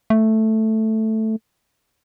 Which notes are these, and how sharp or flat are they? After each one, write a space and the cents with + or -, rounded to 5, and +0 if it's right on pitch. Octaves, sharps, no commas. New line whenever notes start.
A3 +0